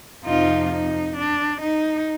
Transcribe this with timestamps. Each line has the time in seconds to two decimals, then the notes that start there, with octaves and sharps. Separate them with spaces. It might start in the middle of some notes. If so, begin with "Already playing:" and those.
0.25 F2 C3 F3 D#4 F4
0.71 D#4
1.16 D4
1.61 D#4